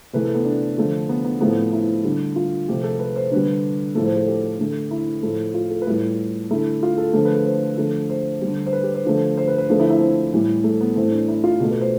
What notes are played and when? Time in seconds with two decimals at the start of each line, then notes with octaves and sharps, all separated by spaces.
0.13 C3 E3 A3 B4
0.25 A4
0.34 B3
0.45 D4
0.78 D3 F3 A3
1.09 B3
1.25 B3
1.41 A2 F3 A3 B3
1.56 C4
1.73 E4
2.04 D3 G3
2.36 F4
2.68 C3 F3 A3 G4
2.84 A4
2.99 B4
3.16 C5
3.31 D3 G3 B4
3.95 A2 F3 A3 A4
4.06 C5
4.17 A4
4.28 G4
4.59 D3 A3
4.91 E4
5.23 A2 F3 A3
5.54 F4
5.71 A4
5.82 B4
5.87 A2 G3 A4
6.51 D3 A3 E4
6.83 F4
6.98 A4
7.13 D3 F3 A3
7.25 B4
7.35 A4
7.46 C5
7.77 D3 F3 A3
8.10 C5
8.41 D3 G3
8.66 C5
8.73 B4
8.83 G4
8.95 C5
9.05 D3 F3 A3
9.37 C5
9.48 B4
9.58 B4
9.69 D3 F3 A3
9.80 E4
9.90 E4
10.00 C4
10.33 A2 E3 G3
10.64 A3
10.81 B3
10.96 A2 E3 A3 C4
11.12 D4
11.28 E4
11.44 F4
11.59 B2 A3 G4
11.71 B4
11.81 C5